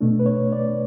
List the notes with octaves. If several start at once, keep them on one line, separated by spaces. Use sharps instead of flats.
B2 A3 D4
B4
C#5
D5